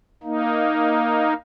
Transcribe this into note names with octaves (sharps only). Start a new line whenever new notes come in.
A#3 D#4